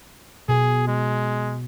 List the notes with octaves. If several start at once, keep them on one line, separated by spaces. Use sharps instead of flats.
B2 G#4
G#3